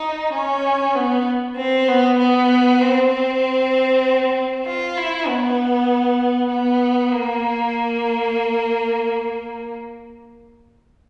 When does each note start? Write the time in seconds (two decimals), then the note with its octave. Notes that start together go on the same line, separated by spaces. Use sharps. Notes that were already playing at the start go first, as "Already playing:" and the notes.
Already playing: D#4
0.33 C#4
0.95 B3
1.57 C4
1.88 B3
2.19 B3
2.81 C4
3.11 C4
4.66 F4
4.97 E4
5.27 B3
6.51 B3
7.13 A#3